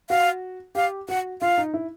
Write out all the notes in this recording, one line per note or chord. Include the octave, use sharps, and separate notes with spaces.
F#4 F5
G4 F5
F#4 F#5
F4 F5
D#4
E4